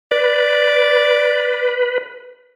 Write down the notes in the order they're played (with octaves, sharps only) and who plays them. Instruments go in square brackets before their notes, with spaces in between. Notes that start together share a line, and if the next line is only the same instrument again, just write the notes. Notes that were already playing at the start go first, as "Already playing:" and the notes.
[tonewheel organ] B4 [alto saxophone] D5